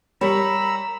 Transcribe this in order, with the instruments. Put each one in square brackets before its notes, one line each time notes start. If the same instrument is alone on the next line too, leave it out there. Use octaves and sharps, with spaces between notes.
[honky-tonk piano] G3 [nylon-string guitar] A#4 C#5 [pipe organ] A#5 E6 [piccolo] B5